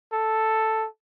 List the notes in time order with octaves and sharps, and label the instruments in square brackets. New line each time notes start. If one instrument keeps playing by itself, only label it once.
[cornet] A4